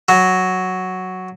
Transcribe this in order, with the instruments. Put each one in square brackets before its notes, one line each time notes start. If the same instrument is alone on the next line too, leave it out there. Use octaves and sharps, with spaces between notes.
[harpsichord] F#3